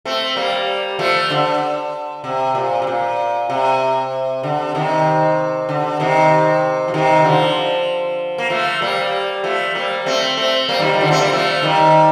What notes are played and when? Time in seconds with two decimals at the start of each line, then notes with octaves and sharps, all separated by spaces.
0.05 A3 C4
0.36 G3 A#3
0.99 F3 A3
1.30 D3
2.24 C3
2.55 A#2
2.82 C3
2.87 A#2
3.50 C3
4.43 D3
4.75 C3 D#3
5.69 D3
6.00 C3 D#3
6.88 F3
6.94 C3 D#3
7.25 D3 F3
8.38 A#3
8.50 F3 A3
8.82 G3 A#3
9.44 F3 A3
9.75 G3 A#3
10.06 A3 C4
10.37 A3 C4
10.69 G3 A#3
10.79 D#3 G3
10.93 G3
11.01 D3 F3
11.11 A3 C4
11.21 G3 A#3
11.32 F3 A3
11.63 D#3 G3